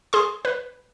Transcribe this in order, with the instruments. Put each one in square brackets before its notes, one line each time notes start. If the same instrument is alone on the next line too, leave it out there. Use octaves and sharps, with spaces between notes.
[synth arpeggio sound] G#4 C6
B4